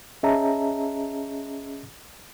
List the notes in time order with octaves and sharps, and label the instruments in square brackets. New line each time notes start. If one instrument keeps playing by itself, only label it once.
[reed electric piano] C#4 G#4 D#5 E5 A5 A#5